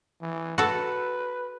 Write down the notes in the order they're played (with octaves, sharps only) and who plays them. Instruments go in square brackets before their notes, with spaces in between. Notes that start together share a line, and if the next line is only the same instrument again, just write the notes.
[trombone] E3
[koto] F#4 A4 [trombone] B4